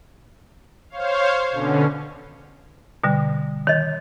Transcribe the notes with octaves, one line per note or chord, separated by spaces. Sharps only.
C5 C#5 F5
B2 D3 C#4
B2 D3 G3
D#3 C#5 D#5